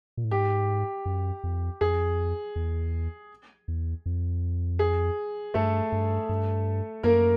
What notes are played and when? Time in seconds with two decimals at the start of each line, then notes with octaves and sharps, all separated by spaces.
0.17 A#2
0.24 A2
0.31 G#2 G4
1.06 F#2
1.44 F2
1.81 F2 G#4
2.56 E2
3.68 E2
4.06 F2
4.79 G#4
5.54 G2 A3 A4
5.92 G2
6.29 G2
7.03 F#2 A#3 A#4